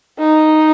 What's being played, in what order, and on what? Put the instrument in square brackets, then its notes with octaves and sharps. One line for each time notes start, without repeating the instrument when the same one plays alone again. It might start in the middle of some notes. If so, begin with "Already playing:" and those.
[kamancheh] D#4